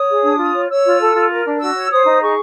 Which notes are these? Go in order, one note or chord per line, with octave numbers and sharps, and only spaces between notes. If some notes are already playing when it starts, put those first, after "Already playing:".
Already playing: C#5 D#6
G#4
D4
F4
C#5
C#5 E6
F4
A4
F4
A#4
D4
F#4 E6
C#5
C5 D#6
D#4
G#4 C#6